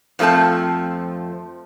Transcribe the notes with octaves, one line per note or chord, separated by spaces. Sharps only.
F2 F3 A3 C4 A5